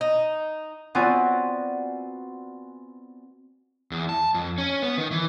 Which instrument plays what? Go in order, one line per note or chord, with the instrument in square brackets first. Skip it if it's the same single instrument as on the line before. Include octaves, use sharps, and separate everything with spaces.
[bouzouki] D#4
[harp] B3 C4 F4 F#4 D5 G#5
[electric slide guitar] E2
A5
F2
C#4
B3
D#3
E3